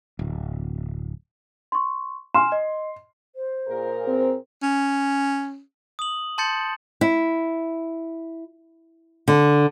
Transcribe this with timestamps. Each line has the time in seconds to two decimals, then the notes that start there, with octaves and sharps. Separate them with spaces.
0.19 D1
1.72 C6 C#6
2.35 G#5 C6 F6 E7
2.52 D#5
3.36 C5
3.68 A#2 G#4 A#4
4.08 C4
4.63 C#4
5.99 D#6 F#7
6.38 A5 C6 G6 A6 C#7 E7
7.01 E4
9.28 D3